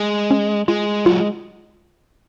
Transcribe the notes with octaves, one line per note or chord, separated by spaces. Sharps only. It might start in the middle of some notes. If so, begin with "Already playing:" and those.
Already playing: G#3
C#4
G#3 F4
F#3 F4